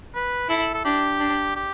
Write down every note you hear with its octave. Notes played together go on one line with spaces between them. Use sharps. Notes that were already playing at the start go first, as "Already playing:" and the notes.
B4
E4 A4
A4
D4 G4
D4
G4